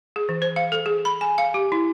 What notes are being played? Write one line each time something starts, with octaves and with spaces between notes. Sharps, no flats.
G#4
E3
C5
F5
A4
G#4
B5
G#5
F5
G4
E4